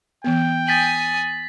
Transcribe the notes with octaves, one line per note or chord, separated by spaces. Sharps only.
E3 B3 G5
G#5 D#6 A6 B6 F#7